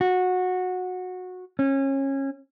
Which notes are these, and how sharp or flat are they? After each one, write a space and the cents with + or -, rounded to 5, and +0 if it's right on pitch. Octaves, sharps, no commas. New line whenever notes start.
F#4 -15
C#4 -25